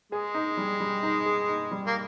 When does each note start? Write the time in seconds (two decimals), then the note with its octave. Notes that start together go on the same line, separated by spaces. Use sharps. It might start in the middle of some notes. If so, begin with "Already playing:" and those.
0.12 G#3 G#4
0.34 D#4
0.57 G3
0.80 G3
1.03 D#4
1.26 G#4
1.48 D#4
1.71 G3
1.87 A#3